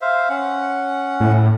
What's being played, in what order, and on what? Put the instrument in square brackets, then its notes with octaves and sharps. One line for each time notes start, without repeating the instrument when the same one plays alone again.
[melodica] C5 E5 F5
C#4 F#5
[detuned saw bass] A2